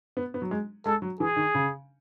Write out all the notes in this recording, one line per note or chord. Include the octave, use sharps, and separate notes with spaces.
B3
B3
F#3
G#3
G#3 A4
F#3
E3 G#4
D#3
C#3